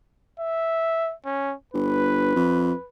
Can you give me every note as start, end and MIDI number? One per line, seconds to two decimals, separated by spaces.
0.40 1.14 76
1.25 1.55 61
1.73 2.34 31
1.73 2.88 71
2.36 2.72 41